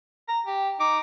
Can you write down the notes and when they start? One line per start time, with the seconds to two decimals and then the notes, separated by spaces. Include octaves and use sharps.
0.28 A#5
0.46 G4
0.80 D#4 D6